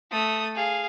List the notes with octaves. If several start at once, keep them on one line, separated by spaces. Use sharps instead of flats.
A3 D#6
G#4 F5